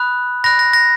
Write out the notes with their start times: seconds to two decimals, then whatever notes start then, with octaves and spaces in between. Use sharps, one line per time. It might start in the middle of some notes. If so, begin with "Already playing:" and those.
Already playing: B5 D#6 F#6
0.44 B5 F#6 A#6
0.59 A#6
0.73 A#6